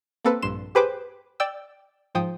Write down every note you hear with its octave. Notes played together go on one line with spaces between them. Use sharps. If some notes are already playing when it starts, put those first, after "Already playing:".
A#3 C4 A4 B4
A#1 G2 C6 E7
G4 G#4 B4 C5 G5 D6
D5 G5 E6
G#2 F3 G5 D#6